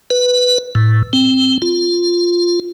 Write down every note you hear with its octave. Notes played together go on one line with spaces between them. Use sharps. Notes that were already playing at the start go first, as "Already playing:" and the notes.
B4
A2
C4
F4